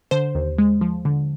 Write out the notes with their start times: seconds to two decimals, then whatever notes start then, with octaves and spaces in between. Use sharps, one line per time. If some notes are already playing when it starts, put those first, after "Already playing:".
0.11 D3 C5
0.35 D#2
0.58 G#3
0.81 F3
1.05 D3